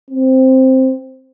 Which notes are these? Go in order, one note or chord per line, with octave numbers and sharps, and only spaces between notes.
C4